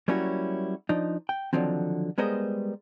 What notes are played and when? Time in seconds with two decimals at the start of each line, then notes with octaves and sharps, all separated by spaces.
0.08 F#3 G3 A#3 C#4 E4 F#4
0.89 F3 D4 D#4
1.29 G5
1.53 D3 D#3 F3 F#3 C4
2.18 G3 G#3 B3 A#4 C5 D#5